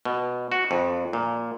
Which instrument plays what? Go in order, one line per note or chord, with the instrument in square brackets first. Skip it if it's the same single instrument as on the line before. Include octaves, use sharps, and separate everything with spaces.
[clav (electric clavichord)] B2
F#4
F2
A#2